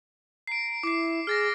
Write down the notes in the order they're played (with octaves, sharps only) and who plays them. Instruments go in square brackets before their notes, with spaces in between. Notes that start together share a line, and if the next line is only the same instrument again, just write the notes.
[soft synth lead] A#5 [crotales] C7 D7
[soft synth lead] E4 [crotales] D6 C7
[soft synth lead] G#4 [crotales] F6 A6 A#6